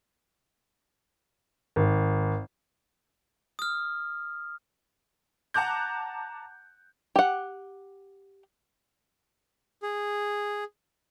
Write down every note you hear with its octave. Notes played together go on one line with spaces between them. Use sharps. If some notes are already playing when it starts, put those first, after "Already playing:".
G#1
D#6 F6
F#5 A5 A#5 D6 F#6 G6
G4 F#5
G#4